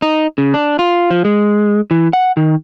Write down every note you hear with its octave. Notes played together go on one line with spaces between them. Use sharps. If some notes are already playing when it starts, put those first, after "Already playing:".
D#4
C#3
D4
F4
F3
G#3
E3
F#5
D#3